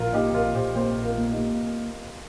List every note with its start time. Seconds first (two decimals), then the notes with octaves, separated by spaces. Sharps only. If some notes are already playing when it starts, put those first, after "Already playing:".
Already playing: A#1 F4 A#4
0.13 A#2 D#4 G4
0.34 A#1 F4 A#4
0.55 A#1 G4 C5
0.75 A#3 G4 C5
0.97 A#1
1.04 F4 A#4
1.18 A#3
1.31 D#4 G4
1.38 A#3